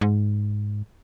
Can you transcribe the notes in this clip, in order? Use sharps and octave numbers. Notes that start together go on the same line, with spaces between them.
G#2